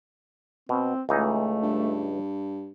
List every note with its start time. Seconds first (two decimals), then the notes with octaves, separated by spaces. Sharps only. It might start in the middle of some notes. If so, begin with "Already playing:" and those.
0.69 B2 C4
1.09 C#2 E3 A3 D#4
1.62 G2